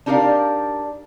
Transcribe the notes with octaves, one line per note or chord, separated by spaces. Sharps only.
D4 D#4 G4 A#4 D5 F5